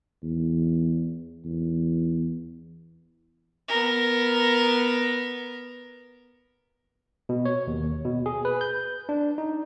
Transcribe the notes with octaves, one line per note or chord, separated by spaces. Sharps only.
E2
E2
B3 A#4
B2
C#5
D#2
B2
G#4
B4
G6
D4
D#4